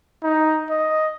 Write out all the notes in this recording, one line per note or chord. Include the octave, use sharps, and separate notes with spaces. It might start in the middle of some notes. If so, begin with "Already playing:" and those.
D#4
D#5